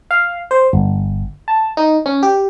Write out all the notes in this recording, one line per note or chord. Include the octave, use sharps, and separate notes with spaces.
F5
C5
G1
A5
D#4
C#4
G4